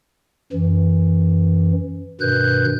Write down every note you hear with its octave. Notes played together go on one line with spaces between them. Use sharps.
F#2 E3
G2 B2 D#3 B4 F#6 G6